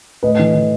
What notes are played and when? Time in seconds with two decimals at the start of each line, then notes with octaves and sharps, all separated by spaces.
0.23 A2 B4 D#5
0.39 E3
0.55 E3